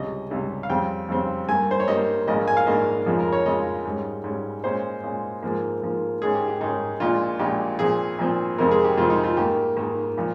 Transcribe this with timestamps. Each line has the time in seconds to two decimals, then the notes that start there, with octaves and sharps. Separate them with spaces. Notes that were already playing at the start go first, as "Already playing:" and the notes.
Already playing: C#2 C3 G3 D#5
0.31 C#2 C3 G3
0.63 F5
0.70 F2 C#3 G3 C4 G5
1.09 F2 C#3 G3 C4
1.48 G2 G3 A#3 G#5
1.71 C5
1.80 C#5
1.87 G2 G3 A#3 D#5
2.27 A#1 G#2 D#3 A#3 D#5
2.48 G#5
2.57 F5
2.67 A#1 G#2 D#3 A#3 D#5
3.06 F2 C#3 F3 G#3
3.20 A#4
3.32 C#5
3.46 F2 C#3 F3 G#3 D#5
3.85 G#2 G3 C#4
4.24 G#2 G3 C#4
4.64 A#2 G#3 C#4 C5
5.03 A#2 G#3 C#4
5.43 G#2 F3 A#3
5.82 G#2 F3 A#3
6.22 G#2 D#3 G#3 C#4 G#4
6.35 G4
6.48 G4
6.61 G#2 D#3 G#3 C#4 D#4
7.00 A#1 A#2 G#3 F4
7.39 A#1 A#2 G#3 G4
7.79 A#2 F3 C4 G#4
8.19 A#2 F3 C4
8.58 F2 C3 D#3 G#3 C4 A#4
8.71 G#4
8.84 G4
8.97 F2 C3 D#3 G#3 C4 F4
9.10 D#4
9.24 F4
9.37 G#2 D#3 A#3 G4
9.77 G#2 D#3 A#3
10.18 A#2 F3